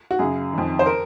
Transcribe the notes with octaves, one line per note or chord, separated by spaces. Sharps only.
F#4
F#2 C#3 G#4
F2 D#3
C5
A#4